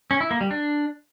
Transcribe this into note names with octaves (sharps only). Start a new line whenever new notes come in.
C#4
E4
A#3
G3
D4